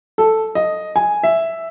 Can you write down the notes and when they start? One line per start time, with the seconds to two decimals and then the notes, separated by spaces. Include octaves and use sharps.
0.18 A4
0.55 D#5
0.96 G#5
1.23 E5